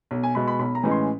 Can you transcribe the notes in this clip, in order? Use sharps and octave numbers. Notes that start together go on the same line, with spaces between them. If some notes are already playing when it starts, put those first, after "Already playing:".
B1
G#5
B2 G#3 B5
B5
B1 B5
A#5
A2 E3 G#3 C#4
C6